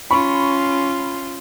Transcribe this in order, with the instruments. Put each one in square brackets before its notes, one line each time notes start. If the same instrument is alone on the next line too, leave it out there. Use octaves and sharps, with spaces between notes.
[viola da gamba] C#4 F4 [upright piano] B5 C#6